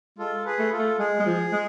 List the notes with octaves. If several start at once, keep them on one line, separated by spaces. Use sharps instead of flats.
G#3 F4 A4
G#4 B4
A3
F4 A4
A3
G#3 G#4
G#3
F3
G#3